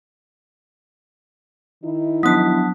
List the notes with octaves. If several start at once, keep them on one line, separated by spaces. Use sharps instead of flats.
D#3 D#4 E4
F3 F#3 B3 D4 A5 D#6 F#6 B6